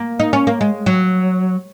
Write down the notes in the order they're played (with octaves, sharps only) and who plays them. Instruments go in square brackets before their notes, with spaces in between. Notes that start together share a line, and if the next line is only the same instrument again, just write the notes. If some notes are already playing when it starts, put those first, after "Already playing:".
Already playing: [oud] A#3
D#4
C#4
A#3
G#3
F#3